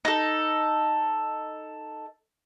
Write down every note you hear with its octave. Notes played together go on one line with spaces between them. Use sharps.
D#4 A4